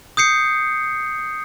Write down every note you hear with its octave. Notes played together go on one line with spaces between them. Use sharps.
D#6 G6 C7 C#7